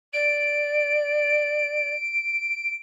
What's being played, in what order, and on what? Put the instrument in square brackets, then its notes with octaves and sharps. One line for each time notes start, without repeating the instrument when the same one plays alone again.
[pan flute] D5 [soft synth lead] D7